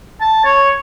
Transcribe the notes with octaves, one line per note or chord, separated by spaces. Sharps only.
A5
C#5